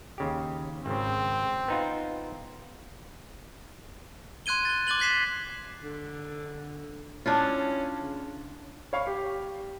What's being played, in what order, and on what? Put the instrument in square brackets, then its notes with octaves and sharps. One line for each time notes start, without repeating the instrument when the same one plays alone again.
[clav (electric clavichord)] D#2 C#3 G4
[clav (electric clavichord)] G#1 C#3 [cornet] C4
[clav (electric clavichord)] B3 D#4 F4
[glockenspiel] C6 F#6 G#6 D#7 G7
A6 G7
D6 F#6 A6 F#7 G7
F#6 G#6 B6 C7 E7
[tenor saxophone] D3
[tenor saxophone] C#4 [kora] D4 E4 F4
[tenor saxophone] C#3
[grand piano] C#5 F5 B5 C#6
G4